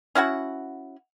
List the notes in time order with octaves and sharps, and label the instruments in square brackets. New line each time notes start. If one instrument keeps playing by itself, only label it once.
[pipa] C#4 E4 F#4 F#5